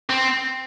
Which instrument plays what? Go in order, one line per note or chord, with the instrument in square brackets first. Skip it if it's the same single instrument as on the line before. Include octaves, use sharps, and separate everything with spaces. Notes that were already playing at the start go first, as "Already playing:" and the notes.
[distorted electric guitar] C4